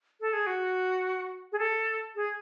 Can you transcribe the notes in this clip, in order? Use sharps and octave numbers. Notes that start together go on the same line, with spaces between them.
A4
G#4
F#4
G#4
A4
G#4